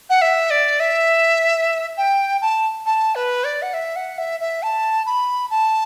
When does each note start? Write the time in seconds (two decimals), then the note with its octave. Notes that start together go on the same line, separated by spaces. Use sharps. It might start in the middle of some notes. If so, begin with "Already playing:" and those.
0.10 F#5
0.22 E5
0.51 D5
0.80 E5
1.98 G5
2.42 A5
2.86 A5
3.15 B4
3.44 D5
3.62 F#5
3.74 E5
3.96 F#5
4.18 E5
4.40 E5
4.63 A5
5.06 B5
5.51 A5